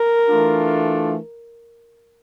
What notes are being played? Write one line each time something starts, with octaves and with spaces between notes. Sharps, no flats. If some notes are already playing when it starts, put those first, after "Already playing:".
Already playing: A#4
E3 A3 D4 F4